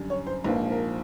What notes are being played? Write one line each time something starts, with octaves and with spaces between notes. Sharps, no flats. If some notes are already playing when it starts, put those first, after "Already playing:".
Already playing: F#2 D3 G3
C#5
C5
A#1 G#2 F3 A#3 B4
A#4